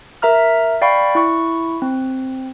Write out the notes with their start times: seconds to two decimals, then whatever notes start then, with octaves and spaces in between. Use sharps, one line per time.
0.22 A#4 E5 A#5 F6
0.82 D5 F5 G5 B5 C#6
1.15 E4 C#6
1.82 C4